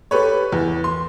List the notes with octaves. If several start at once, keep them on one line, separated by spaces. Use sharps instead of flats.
G4 A4 B4 C#5
E2
C6